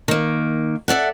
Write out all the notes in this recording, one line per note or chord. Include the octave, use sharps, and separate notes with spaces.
D#3 A#3
A4 D5 E5 F#5